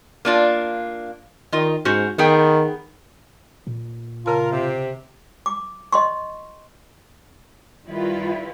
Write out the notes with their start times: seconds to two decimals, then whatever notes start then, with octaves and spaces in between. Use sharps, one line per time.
0.25 A#3 D4 F4
1.52 D#3 F4 D#5
1.85 G#2 C#4 F#4 C5
2.18 D#3 B3 G#4 G5
3.67 A#2
4.26 C#3 F4 A#4 A5
4.52 C3
5.46 D6
5.93 D#5 C6 C#6
7.87 D#3 G3 E4 F4 B4